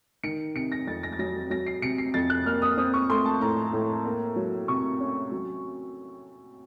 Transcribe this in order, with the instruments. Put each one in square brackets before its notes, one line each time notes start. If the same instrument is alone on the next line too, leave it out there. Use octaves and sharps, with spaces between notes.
[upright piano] D#3 C#7
C3 C#7
A#6
F2 A6
A#6
A6
F#3 A#6
F#3 A#6
C7
C3 C#7
C7
F2 A6
F#6
A#3 F6
D#6
C4 D#6
C#6
A3 C6
A5
A2 A#5
A2
A#3
F#3
C3 C#6
C#4
F#3